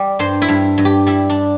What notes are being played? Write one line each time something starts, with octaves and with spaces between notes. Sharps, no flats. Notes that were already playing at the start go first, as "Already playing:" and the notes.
Already playing: G3 D5
G2 C5
E4
G2
G2
G4
G3 E4
D4